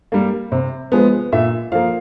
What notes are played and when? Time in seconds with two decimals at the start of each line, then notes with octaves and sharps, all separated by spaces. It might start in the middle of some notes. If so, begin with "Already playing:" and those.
0.12 G3 A#3
0.52 C3
0.92 F3 G#3 B3
1.32 A#2 E5
1.72 F3 A#3 F5